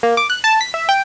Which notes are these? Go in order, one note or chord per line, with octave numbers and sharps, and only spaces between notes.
A#3
D6
F#6
A5
B6
E5
G5